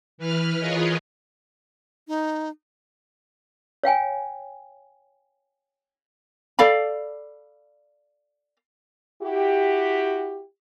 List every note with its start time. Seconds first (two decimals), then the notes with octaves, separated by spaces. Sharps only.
0.18 E3 B4 F6
0.59 F4 G#4 A#4 B4 C#5 D#5
2.08 D#4
3.84 C#5 F5 G5 G#5
6.59 A4 D5 F5 B5
9.22 E4 F#4 G4